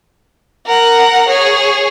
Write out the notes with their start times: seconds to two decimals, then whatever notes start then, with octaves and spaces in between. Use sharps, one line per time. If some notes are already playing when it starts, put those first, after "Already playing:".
0.66 A#4 F#5
1.29 G#4 C#5